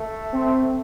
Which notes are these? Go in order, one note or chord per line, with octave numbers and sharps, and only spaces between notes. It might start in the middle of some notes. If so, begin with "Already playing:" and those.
Already playing: A3
C4